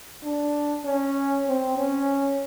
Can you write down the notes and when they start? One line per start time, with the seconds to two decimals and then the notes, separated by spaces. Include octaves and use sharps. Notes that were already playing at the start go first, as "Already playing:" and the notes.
0.24 D4
0.85 C#4
1.47 C4
1.78 C#4